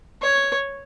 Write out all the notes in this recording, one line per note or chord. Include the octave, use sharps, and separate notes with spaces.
C#5